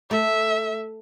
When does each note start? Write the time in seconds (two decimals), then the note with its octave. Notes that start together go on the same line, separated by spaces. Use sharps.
0.11 A3 E5